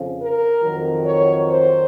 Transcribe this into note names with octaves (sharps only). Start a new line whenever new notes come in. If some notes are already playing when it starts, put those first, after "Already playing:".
Already playing: F2 C#3 F3
A#4
F2 D#3 F#3
C#5
C5